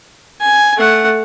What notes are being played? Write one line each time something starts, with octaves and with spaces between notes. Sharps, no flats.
G#5
A3 F#5